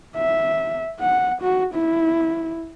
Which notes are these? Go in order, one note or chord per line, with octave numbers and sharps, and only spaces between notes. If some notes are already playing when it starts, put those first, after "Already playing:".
E5
F#5
F#4
E4